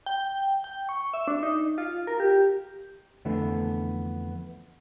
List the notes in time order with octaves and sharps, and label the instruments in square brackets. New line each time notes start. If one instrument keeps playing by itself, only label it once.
[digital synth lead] G5
G5
C#6
E5
D4
D#4
F4
A#4
G4
[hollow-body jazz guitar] F2 D3 E3 A3 B3